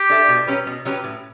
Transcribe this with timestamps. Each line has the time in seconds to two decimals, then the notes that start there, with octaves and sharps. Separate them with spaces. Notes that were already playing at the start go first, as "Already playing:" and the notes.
Already playing: G4
0.10 D4 A4 E5
0.29 B2
0.47 F#3 C#4 G4 B4
0.67 B2
0.85 F#3 C#4 G4 B4
1.04 A2